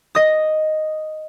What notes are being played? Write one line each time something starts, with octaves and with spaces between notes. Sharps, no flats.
D#5 D#6